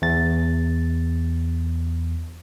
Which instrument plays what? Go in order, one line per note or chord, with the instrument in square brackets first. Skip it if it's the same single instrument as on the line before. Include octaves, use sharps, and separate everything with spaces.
[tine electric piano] E2 A6